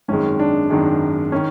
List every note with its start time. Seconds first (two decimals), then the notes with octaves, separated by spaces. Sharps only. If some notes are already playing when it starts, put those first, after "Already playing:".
0.08 G#1 F#2 D#3 G#3 C#4
0.40 D4
0.70 G#1 F#2 D#3 G#3
1.32 D#3 C#4